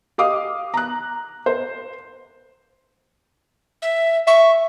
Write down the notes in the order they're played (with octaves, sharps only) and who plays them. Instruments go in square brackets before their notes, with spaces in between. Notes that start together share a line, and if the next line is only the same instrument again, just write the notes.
[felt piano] G4 D#5 F5 D6 D#6
A#5 F#6
C5
[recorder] E5
[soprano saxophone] E5 [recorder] C#6